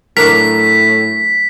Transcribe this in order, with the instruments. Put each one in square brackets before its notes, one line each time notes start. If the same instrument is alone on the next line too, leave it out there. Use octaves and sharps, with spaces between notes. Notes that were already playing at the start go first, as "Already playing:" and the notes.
[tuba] A2 [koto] F#3 D4 A#4 [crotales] B6